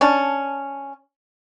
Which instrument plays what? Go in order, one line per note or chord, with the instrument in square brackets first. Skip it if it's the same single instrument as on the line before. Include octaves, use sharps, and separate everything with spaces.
[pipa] C#4 D4 A5